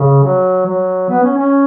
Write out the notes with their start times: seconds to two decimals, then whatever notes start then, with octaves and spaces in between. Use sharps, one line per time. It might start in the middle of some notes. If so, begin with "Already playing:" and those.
Already playing: C#3
0.23 F#3
0.66 F#3
1.09 B3
1.23 C#4
1.37 C#4